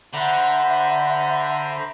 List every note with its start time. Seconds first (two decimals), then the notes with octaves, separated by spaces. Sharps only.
0.14 D3 C5 E5 F#5 A#5 B5